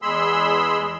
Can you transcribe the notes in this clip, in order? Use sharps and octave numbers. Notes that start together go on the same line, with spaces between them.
E2 G#3 G#4 B5 C6 E6